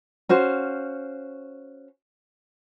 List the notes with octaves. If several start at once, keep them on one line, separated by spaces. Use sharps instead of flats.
C#4 F#4 C5 F5